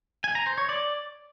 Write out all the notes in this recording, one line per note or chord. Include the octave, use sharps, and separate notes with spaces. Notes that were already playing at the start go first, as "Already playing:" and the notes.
G#5
A#5
C5
C#5
D5